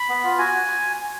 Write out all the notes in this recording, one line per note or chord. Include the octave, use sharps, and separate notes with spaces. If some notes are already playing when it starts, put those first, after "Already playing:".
Already playing: B5
B3
F4
F#4 G#5